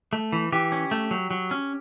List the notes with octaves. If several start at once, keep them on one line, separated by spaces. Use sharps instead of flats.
A3
E3
E3 G4
C#4
A3
F#3
F#3
C#4